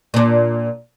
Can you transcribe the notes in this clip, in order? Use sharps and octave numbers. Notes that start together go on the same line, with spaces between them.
A#2 D4